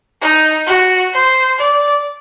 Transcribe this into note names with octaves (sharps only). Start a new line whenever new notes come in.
D#4
F#4
C5
D5